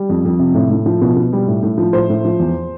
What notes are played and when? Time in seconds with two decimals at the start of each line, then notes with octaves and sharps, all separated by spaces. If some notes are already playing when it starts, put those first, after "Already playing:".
Already playing: G3
0.09 F2
0.25 F2
0.39 C3
0.54 A2
0.70 A2
0.86 F3
1.01 B2
1.16 B2
1.33 G3
1.48 A2
1.63 A2
1.78 F3
1.93 A2 C5
2.10 A2
2.25 F3
2.40 E2